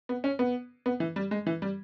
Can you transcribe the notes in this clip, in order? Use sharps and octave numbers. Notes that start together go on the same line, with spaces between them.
B3
C#4
B3
B3
E3
G3
G#3
E3
G3